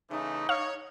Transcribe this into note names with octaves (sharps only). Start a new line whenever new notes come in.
C#3 E3 A3 D#4
C#5 F5